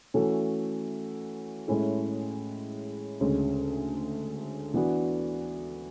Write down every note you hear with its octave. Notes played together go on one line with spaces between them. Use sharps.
E3 A3 C#4 F#4 A4
A2 G#3 C#4 E4 A4
D2 C#3 G#3 C#4
E3 B3 D4 F#4